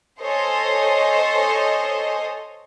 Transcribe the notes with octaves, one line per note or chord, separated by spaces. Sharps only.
A4 C5 C#5 D#5 G#5